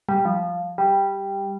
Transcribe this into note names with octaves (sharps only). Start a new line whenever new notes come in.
G3
F3
G3